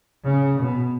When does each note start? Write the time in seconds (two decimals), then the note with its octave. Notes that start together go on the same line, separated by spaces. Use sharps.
0.24 C#3
0.58 B2